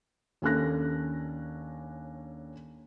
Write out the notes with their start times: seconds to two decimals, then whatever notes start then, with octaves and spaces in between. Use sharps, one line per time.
0.42 D#2 C#4 D4 A4 F#6 A#6